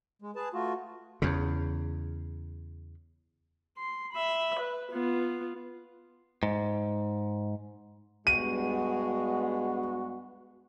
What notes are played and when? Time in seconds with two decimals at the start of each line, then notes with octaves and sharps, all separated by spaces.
0.22 G#3
0.36 G#4 B4 A5
0.54 A3 F4 F#4
1.22 E2 C#3
3.78 C6
4.13 E5 B5
4.60 B4
4.92 B3 F4
6.43 G#2
8.27 G2 G#3 B3 F#4 D#7